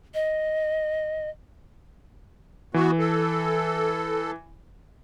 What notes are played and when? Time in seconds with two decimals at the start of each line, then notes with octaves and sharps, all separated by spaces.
0.14 D#5
2.74 E3 B3 F#4
2.99 A4